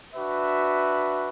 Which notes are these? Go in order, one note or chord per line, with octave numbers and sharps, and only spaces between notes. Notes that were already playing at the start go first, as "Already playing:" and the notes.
D4 F#4 B4 E5